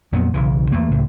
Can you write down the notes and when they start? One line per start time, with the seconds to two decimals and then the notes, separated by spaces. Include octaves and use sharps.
0.12 F2 A#2 F#3 B3
0.34 B1 C#3 E3
0.72 E2 A3 A#3
0.90 C#2 A2 C#3